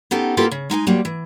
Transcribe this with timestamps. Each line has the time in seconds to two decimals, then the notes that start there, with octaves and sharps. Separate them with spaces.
0.11 B3 C#4 D#4 G4 A4
0.37 A#3 E4 F4 G4 A4 B4
0.51 C#3
0.70 G#3 D#4 G5 G#5
0.87 F#3 G3 A#3 C4
1.05 E3